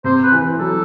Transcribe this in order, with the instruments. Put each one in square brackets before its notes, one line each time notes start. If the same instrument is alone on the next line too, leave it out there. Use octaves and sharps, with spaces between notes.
[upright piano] C3 [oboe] C5
[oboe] B4
[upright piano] E3
[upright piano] F#3 [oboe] A4